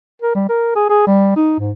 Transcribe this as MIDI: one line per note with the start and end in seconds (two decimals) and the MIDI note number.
0.22 0.35 70
0.35 0.48 55
0.49 0.74 70
0.76 0.89 68
0.90 1.03 68
1.07 1.32 55
1.36 1.56 63
1.59 1.72 44